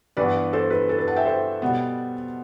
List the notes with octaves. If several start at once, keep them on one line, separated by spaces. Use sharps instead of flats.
G2 E3 B3 B4 D5
A4 C5
B4
A4
B4
F#5 A5
E5 G5
A4 C5
B2 G3 B3